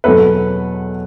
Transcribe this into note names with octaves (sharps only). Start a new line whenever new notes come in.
E2 B2 F#3 A4 B4